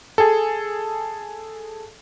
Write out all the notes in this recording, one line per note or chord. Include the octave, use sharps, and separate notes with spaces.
G#4 A4